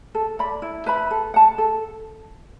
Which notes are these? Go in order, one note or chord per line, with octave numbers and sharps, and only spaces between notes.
A4
D5 B5
E4
B4 E5 B5
A4
F#5 A5
A4